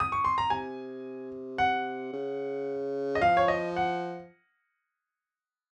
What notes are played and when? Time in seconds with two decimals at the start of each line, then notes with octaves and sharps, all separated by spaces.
0.00 D#6
0.12 C#6
0.25 C6
0.38 A#5
0.50 C3 G#5
1.58 F#5
2.13 C#3
3.15 D#5
3.21 F3 F5
3.37 C#5
3.48 D#5
3.76 F#5